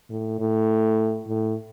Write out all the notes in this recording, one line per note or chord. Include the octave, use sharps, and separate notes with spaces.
A2
A2
A2